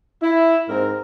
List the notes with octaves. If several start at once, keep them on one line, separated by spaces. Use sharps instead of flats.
E4
G#2 C4 A#4